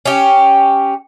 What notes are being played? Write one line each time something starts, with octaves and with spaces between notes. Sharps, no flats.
C#4 G4